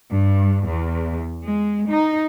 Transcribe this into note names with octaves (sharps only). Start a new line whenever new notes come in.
G2
E2
G#3
D#4